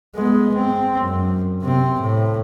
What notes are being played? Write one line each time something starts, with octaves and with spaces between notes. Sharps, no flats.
G#3 B3
C4
F#2
C3 C4
A2